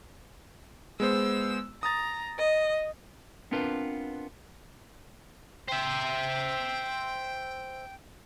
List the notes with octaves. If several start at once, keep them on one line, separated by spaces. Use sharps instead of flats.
G#3 B3 C5 E6
A#5 D#6 A6
D#5
B3 C4 D4 F4 A#4 B4
C5 E5 G5